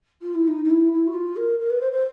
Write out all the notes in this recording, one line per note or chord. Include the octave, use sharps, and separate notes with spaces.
F4
E4
D#4
D#4
E4
E4
F#4
F4
A#4
A#4
B4
C5
C5